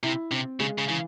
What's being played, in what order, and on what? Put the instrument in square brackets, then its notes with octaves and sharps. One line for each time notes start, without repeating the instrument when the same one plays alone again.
[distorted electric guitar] C3 [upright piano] E4
[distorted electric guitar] C3 [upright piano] C4
[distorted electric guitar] C#3 [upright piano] G#3
[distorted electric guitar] C#3
[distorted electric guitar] C#3 [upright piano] E3